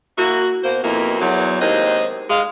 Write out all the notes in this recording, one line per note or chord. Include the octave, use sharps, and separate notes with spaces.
A#3 E4 F#4
B2 A#3 C5
F2 B2 F3 A#3 E4
E2 F#3
D#2 G#3 C4 D#5
G#3 F5